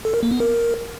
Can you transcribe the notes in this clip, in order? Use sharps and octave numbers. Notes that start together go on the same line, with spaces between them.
A4
A#4
A#3
B3
A#4